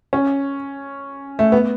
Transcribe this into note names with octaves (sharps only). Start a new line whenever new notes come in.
C#4
A3
B3